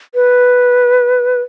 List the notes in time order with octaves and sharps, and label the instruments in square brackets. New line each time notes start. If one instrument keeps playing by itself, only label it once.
[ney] B4